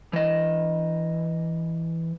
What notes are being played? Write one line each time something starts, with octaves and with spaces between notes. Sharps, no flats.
E3 D#5